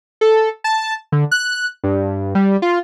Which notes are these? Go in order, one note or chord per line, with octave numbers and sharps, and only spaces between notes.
A4
A5
D3
F#6
G2
G3
F4